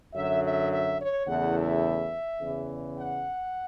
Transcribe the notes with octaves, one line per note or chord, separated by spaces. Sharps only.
F#2 D3 F#3 E5
E5
E5
C#5
E2 C#3 E3 A3 E4 F#5
E5
E2 C#3 E3
F#5